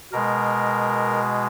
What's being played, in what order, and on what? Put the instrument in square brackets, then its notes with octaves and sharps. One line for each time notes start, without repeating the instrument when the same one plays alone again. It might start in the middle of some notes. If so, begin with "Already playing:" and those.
[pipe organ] B2 G#3 A#4